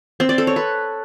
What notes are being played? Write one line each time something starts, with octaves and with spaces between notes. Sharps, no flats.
C4
D5
A4
C#5
B4